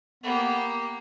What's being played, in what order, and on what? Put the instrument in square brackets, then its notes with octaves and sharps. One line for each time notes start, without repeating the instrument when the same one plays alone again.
[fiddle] A#3 G4 [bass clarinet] B3